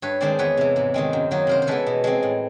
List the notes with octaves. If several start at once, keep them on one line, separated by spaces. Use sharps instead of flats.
G2 B4 C#5
D#3 G#3 C4 C5 D5
E2 B4 C#5
C3 E3
G#2
D#3 G#3 C4
F#2
D#3 F#3 A#3
C3 A#4 C5
C5
E3 G#3 B3 A4 B4
B2
G#3 C4
A2